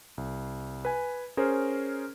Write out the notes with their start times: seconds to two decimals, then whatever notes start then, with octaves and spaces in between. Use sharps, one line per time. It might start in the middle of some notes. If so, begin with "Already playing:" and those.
0.18 C2
0.85 B4 G#5
1.37 C#4 G#4 A#4 C5